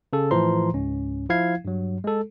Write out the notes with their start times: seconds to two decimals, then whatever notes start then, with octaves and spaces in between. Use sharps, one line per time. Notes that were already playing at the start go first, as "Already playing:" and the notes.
0.13 C#3 A4
0.31 A2 E3 F3 C5 A#5 C6
0.74 C#2 G#2 C#4
1.29 F3 E4 F5 G#6 C7
1.65 G2 F#3
2.04 G#3 A4